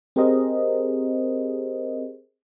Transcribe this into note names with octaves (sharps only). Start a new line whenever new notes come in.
C4 G4 G#4 A#4 C5 D#5